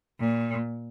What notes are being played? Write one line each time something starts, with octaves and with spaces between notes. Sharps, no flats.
A#2